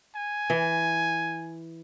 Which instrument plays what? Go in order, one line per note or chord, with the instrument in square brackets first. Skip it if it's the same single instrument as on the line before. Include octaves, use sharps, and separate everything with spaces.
[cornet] G#5
[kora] E3